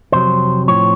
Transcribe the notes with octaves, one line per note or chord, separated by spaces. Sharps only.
F2 C3 F#3 C5
A2 F3 C4 C#5